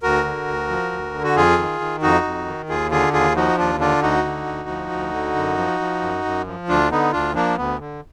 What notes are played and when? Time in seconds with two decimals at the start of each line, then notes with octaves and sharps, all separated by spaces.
0.03 D2 F#4 A#4
0.24 D3
0.48 D2
0.70 F3
0.92 D2
1.14 D3
1.24 F#4
1.36 F2 F4 G#4
1.58 D#3
1.80 D#3
2.02 F2 D#4 F#4
2.24 F2
2.46 D#3
2.69 D#2 F4 G#4
2.91 D3 F4 G#4
3.13 D#2 F4 G#4
3.36 F3 D#4 F#4
3.58 D#2 D4 F4
3.80 D3 D4 F4
4.02 D2 D#4 F#4
4.25 D3
4.46 D2
4.69 F3
4.91 D2
5.13 D3
5.36 F#2
5.57 F3
5.81 F3
6.02 F#2
6.25 F#2
6.47 F3
6.68 D2 D4 F4
6.91 D3 B3 D#4
7.13 D2 D4 F4
7.35 F3 A#3 D4
7.57 D2 B3
7.79 D3